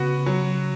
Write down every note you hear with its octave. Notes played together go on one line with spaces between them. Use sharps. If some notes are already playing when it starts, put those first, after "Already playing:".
Already playing: C#3 B3 F#4
F#3